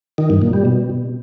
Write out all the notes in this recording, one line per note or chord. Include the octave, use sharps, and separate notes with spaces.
D#3
G2
A#2
G3
B2